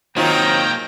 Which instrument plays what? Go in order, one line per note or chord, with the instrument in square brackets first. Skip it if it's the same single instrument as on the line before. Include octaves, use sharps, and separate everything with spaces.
[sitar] D#3 C4 F4 [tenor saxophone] F#3 [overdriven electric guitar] A#3 G#4 [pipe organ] G5 A#5